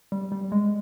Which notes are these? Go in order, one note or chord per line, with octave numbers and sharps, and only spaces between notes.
G3
G3
G#3